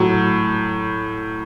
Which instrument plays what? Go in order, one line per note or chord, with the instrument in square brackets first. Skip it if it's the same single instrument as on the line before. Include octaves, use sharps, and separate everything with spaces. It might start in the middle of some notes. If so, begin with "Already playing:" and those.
Already playing: [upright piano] A2 F#3